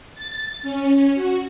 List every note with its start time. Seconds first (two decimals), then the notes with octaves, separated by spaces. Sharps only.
0.15 A6
0.62 C#4
1.15 F#4